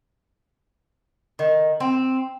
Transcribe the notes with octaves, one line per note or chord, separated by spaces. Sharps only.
D#3
C4